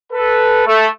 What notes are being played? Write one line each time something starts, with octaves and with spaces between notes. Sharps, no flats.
A4 B4
A3